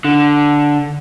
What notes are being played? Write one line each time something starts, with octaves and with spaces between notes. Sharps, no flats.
D3